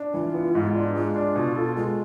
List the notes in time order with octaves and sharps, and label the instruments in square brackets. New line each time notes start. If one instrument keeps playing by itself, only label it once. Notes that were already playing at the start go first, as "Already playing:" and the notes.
Already playing: [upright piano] D4
[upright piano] E3 [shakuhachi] F4
[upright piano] B3
G#2
D4
[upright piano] G#3 [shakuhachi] F4
[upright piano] D4
B2
A4
[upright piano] G#3 [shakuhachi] F4